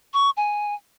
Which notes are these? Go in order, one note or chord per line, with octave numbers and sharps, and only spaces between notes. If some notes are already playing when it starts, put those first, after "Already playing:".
C#6
G#5